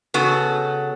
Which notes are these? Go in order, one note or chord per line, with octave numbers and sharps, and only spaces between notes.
C#3 B3 F#4 A4